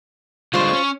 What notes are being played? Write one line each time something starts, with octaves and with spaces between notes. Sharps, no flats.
D3 G3 G#3 F4 C5 C#6
C#4